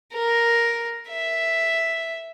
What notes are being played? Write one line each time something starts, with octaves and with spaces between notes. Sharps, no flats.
A#4
E5